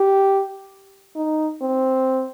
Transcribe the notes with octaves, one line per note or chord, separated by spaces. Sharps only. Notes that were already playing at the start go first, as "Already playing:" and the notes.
Already playing: G4
D#4
C4